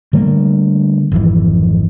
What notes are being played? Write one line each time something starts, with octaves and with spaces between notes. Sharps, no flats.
D3 G3 A3 A#3
G#1 F2 E3